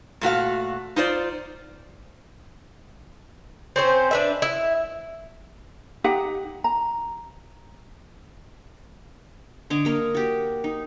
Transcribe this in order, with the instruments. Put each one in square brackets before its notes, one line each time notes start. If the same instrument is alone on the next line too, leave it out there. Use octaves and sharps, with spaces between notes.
[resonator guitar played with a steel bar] A#2 A3 F#4 F5
D#4 F4 C5 D5
[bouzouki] C4 C#4 C5
D4 B4 E5
E4
[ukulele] D#4 G4 F#5 G5
A#5
[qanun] D3 C#5 D#5 D6
A#3 A#4 D#5
F#4 G4
D#4